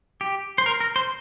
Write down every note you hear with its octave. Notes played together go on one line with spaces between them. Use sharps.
G4
C5
A#4
A#4
C5